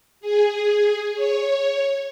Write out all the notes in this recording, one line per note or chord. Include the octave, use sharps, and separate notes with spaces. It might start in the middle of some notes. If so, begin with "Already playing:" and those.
G#4
C#5